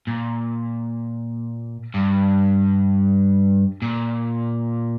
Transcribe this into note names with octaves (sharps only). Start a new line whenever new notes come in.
A#2
G2
A#2